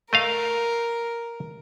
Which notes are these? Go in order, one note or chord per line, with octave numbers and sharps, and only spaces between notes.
A3 A#4 D#5 F5